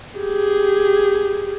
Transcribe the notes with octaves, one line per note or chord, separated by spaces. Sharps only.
G4 G#4